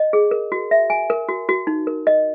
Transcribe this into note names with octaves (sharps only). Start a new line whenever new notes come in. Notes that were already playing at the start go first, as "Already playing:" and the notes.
Already playing: D#5
G#4
A#4
F#4
E5
G#5
A#4
F#4
F#4
D#4
A#4
D#5